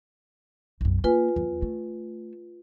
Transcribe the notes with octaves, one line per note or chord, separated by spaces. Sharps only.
B1 F#2
A#3 F4 B4 G#5
E2 F#3
A3